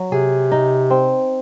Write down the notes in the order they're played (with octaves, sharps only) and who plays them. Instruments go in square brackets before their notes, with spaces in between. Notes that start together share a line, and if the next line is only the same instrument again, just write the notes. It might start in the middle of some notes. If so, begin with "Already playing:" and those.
Already playing: [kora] F#3
[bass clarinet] C3 [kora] G#4
[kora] D#4
C4